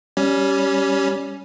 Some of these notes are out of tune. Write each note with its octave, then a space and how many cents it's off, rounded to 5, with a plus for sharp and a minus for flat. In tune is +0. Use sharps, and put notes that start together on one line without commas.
G3 -10 C#4 +10